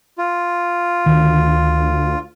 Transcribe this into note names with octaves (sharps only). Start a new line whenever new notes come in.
F4
D2 D#3